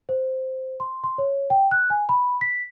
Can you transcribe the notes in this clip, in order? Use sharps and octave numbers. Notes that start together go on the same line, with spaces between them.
C5
C6
C6
C#5
G5
F#6
G#5
B5
B6